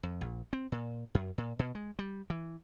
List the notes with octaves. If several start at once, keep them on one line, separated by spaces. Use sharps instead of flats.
F2
A#1
C4
A#2
F#2
A#2
B2
G#3
G3
E3